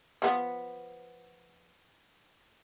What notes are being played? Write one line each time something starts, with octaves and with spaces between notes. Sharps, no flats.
F3 B3